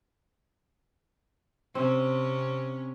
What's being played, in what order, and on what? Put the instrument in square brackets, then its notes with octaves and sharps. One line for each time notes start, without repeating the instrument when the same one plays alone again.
[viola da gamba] C3 C#4 [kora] C4